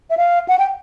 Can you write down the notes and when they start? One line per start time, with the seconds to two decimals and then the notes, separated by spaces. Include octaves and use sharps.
0.10 E5
0.17 F5
0.48 F#5
0.59 G5